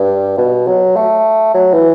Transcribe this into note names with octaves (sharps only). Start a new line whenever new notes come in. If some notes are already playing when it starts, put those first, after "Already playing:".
Already playing: G2
B2
F#3
A3
F#3
E3